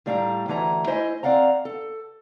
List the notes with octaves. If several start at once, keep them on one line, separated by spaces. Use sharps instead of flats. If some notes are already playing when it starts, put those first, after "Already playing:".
A2 G3 A3 F5 G#5 A#5
D2 E3 A3 E4 A#5
A3 E4 C5 D#5 G#5
C4 D5 F5 F#5 A#5
A4